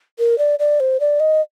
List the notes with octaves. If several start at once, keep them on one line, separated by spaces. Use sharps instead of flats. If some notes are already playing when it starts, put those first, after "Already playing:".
A#4
D5
D5
C5
D5
D#5